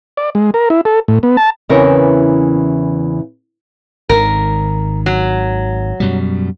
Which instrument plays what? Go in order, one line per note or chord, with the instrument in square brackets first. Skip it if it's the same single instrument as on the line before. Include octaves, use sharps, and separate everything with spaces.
[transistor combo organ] D5
G#3
A#4
E4
A4
A2
B3
A5
[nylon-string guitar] E2 C#3 E3 C4 A#4 C#5
[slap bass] G#1 D#3 [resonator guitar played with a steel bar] A#4
[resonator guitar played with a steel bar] F#3
[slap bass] F#2 B2 G3